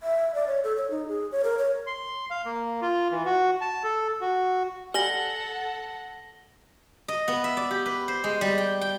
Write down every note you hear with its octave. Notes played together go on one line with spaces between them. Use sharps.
E5
D5
C#5
A4
C#5
D#4
G#4
C#5
A#4
C#5
C6
F5
A#3
F4
E3
F#4
A5
A4
F#4
G3 A4 F#5 G#5 A#6 F#7 G7
D#5
B3
E5
D5
G4
B4
C5
G#3
G3
G5
G5